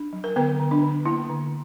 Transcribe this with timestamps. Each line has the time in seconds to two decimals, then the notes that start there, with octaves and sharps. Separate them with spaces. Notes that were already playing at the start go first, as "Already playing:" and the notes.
Already playing: D4
0.13 F#3
0.24 A#4
0.36 D3 B3 B4
0.60 D3
0.71 D4
0.82 D3
1.05 A#3 E4
1.29 D3